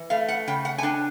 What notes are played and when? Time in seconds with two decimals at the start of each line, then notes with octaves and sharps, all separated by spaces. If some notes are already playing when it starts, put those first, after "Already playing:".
Already playing: E3
0.10 A3 F5
0.28 F#5
0.48 C#3 G5
0.65 F#5
0.78 G#5
0.83 D4 G5